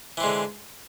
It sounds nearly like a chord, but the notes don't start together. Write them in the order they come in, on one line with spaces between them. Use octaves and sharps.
E3 C4 G#3 D3